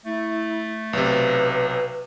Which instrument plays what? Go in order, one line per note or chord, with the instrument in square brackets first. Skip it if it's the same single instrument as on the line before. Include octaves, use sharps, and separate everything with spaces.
[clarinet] A3 [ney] E4
[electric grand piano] B1 C3 [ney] B4